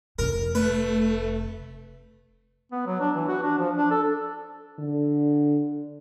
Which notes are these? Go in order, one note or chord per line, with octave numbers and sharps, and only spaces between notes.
F1 C3 A#4
A3 B4
B3
F#3
D4
E3
F#4
D4
F3
D4
A4
D3